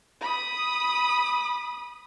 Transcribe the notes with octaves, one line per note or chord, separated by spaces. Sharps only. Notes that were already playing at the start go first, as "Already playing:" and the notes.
B5 D#6